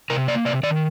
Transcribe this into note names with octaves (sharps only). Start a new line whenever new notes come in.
C3 A#4
A#3 D5
C3 D5
D#3 D5